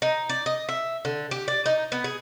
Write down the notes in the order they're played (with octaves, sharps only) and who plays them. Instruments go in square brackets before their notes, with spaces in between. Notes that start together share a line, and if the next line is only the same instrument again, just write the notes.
[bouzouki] D#4
D5
D#5
E5
D3
G4
D5
D#4
B3
G#4